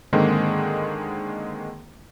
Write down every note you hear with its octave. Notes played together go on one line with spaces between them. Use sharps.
G#2 D3 D#3 G#3 A#3 C4